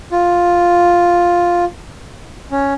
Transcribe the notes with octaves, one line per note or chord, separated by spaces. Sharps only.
F4
C#4